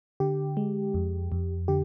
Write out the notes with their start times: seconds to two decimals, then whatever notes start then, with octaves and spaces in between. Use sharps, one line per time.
0.20 D3 G4
0.57 G#3
0.94 F2
1.32 F2
1.68 D3 G4